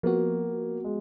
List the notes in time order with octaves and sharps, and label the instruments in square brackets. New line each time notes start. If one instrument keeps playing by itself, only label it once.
[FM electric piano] F3 B3 F#4 [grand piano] A#3
[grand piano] G#3